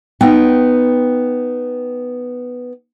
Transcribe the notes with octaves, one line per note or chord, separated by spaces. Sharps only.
B3 D#4 G5